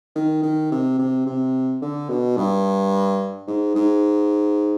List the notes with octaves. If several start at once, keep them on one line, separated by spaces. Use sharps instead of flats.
D#3
D#3
C3
C3
C3
D3
B2
G2
G#2
G#2